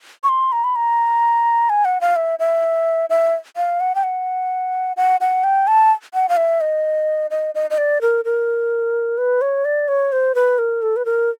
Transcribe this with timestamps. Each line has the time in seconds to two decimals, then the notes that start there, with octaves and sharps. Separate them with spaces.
0.24 C#6
0.29 C6
0.52 A#5
0.64 B5
0.76 A#5
1.70 G#5
1.85 F#5
2.01 F5
2.16 E5
2.39 E5
3.10 E5
3.56 F5
3.80 F#5
3.95 G5
4.03 F#5
4.97 F#5
5.21 F#5
5.44 G5
5.67 A5
6.14 F#5
6.29 F5
6.37 E5
6.61 D#5
7.31 D#5
7.55 D#5
7.70 D#5
7.78 D5
8.01 A#4
8.25 A#4
9.18 B4
9.41 C#5
9.65 D5
9.88 C#5
10.12 C5
10.35 B4
10.58 A#4
10.82 A4
10.96 B4
11.05 A#4